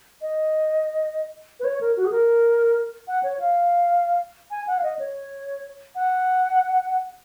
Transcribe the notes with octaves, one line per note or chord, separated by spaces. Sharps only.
D#5
B4
C#5
A#4
F#4
G#4
A#4
F#5
C#5
F5
G#5
F#5
F5
D#5
C#5
F#5